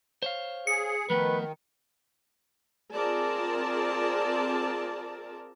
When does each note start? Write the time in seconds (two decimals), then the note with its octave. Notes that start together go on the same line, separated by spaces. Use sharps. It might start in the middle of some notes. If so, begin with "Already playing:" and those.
0.23 C5 C#5 F5
0.67 G#4 C#7
1.10 D#3 F3 A3 B3 B4
2.93 C4 F4 G#4 A#4 D5 A5